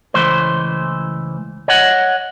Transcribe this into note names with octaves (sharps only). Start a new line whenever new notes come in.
C#2 E3 A3 C5
C#5 D#5 F#5